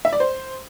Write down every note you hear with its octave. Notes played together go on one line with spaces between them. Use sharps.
E5
D5
C5